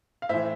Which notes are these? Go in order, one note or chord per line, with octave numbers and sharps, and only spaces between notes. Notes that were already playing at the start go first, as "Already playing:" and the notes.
F5
A2 E3 C5 E5